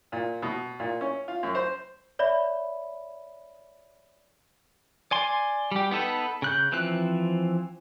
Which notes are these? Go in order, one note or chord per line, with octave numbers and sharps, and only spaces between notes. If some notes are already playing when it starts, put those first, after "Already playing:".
A#2
B2
A#2
C#4
F4
F#2
C5
C#5 D5 E5 B5
D5 G#5 C6
G3 G4
B3 D#4 A4 B4
C#3 F#6 G6
E3 F3 C4 F#6